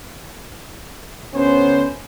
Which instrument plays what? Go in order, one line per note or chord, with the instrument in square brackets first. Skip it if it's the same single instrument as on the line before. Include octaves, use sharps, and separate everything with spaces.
[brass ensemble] D2 B3 C#4 C5